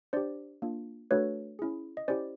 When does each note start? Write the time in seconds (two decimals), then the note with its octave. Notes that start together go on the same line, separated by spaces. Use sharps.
0.13 D4 G4 C5 D5
0.62 A#3 D4 F4
1.11 A3 D4 F#4 A4 B4 C#5
1.59 C#4 E4 G#4
1.97 D#5
2.08 C#4 E4 G4 C5 D5